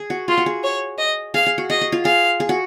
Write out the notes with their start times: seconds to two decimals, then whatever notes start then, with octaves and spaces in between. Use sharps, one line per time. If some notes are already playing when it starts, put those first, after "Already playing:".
Already playing: G#4
0.10 F#4
0.28 F4 G#4
0.38 F#4
0.46 G#4
0.63 C#5
0.98 D#5
1.34 G#4 F5
1.46 G#4
1.58 F#4
1.70 G#4 D#5
1.81 G#4
1.92 F4
2.05 G#4 F5
2.40 G#4
2.49 F#4